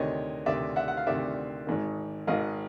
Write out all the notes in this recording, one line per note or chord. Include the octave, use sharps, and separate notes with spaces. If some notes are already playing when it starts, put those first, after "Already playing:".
Already playing: D2 C3 D#3 C#5 D#5
D2 C3 D#3 D5 E5
E5 F#5
F#5
F5
D2 C3 D#3 D5 E5
G#1 G#2 D#3
G#1 G#2 D#3 D#5 F5